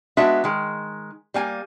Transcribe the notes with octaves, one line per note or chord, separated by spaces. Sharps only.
G#3 B3 D4 F#4 E5
D#3 G#3
G3 A#3 G#5